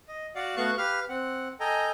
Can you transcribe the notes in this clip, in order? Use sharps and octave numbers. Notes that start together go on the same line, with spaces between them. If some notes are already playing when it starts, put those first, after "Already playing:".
D#5
F#4 D5 F5 F#5
A3 B3 F#4 F5 C#6 F#6
G4 B4 F5 F6
C4 F#5
A4 D#5 G5 G#5 A#5